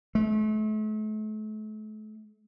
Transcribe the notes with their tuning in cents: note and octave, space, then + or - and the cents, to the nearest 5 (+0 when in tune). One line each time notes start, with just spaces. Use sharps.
A3 -40